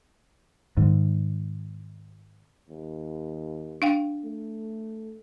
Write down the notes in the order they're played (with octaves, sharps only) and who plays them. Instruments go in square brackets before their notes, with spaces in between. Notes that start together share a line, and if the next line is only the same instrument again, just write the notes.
[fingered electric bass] G#2 D#3
[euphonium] D#2
[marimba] D4 F5 G5
[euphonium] A3